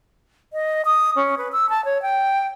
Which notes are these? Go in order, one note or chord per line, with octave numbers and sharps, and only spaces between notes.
D#5
D#6
C#4
B4
E6
A5
C#5
G5